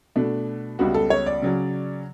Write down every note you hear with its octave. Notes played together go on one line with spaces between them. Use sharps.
B2 A3 D4
C#2 C#3 G3 B3 F#4
A4
C#5
D5
C#3 F#3 C#4